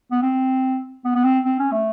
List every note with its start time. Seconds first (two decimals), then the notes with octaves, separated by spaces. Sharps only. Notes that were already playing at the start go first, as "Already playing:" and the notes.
0.12 B3
0.22 C4
1.05 B3
1.15 B3
1.24 C4
1.45 C4
1.59 C#4
1.72 A3